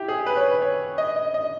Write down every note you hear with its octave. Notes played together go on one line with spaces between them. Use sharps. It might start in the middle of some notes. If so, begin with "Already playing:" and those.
Already playing: E4 G4
G#4
B4
C#5
B4
C#5
D#5
D#5
D#5